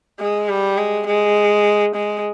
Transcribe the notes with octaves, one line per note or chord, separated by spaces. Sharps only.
G#3
G3
G#3
G#3
G#3